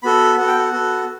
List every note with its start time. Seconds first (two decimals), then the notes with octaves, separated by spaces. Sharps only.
0.03 B3 F#4 A4 B5
0.37 B3 F#4 A4 F#5
0.47 G5
0.59 F#5
0.72 B3 F#4 A4